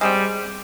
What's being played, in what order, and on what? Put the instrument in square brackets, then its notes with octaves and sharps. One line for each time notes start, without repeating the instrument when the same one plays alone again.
[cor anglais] G3 [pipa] G#3 C4 G4